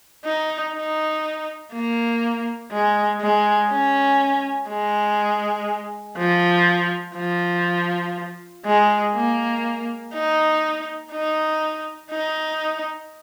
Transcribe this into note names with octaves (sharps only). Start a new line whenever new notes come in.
D#4
D#4
A#3
G#3
G#3
C#4
G#3
F3
F3
G#3
A#3
D#4
D#4
D#4